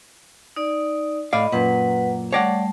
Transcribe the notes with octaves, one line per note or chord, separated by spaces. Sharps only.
D#4 D5
A2 D5 D#5 F5 B5
F#2 A#2 B4 F#5
G3 A3 C#5 D5 F#5 A5